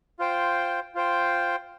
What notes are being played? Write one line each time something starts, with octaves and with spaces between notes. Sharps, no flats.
F4 C5 G5
F4 C5 G5